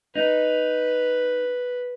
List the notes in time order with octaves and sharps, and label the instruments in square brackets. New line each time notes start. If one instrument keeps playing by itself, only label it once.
[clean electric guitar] D#4 [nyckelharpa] B4